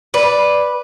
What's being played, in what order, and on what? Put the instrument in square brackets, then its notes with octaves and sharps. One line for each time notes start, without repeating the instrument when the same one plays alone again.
[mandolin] B4 [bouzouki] D5